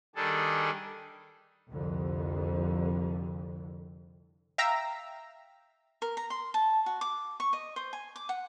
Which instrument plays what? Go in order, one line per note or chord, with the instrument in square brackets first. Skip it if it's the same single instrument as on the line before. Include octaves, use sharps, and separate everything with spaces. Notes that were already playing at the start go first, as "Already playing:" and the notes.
[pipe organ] D#3 G3 D4 G#4 A4
[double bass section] C2 F2 D3
[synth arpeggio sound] E5 F5 G5 A#5 E6 A#6
[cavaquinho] A#4
A#5
C6
A5
F#4
D6
C#6
D#5
C5
G#5
D6
F#5